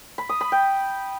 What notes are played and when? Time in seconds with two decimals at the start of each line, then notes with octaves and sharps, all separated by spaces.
0.18 B5
0.29 D#6
0.41 B5
0.52 G5